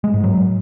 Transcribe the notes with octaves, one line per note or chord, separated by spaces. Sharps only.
G#3
G#2
F#3